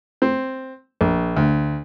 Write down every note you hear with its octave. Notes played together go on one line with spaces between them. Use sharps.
C4
A#1
D2